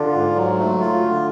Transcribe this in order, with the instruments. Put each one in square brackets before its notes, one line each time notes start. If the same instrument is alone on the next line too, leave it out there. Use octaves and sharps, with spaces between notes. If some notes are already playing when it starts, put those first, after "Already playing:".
Already playing: [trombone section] D3 [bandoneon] F4
[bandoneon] G#2
F#3
A3
F4
D3